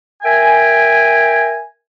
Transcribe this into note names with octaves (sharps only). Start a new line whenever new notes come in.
A#4 E5 G5 G#5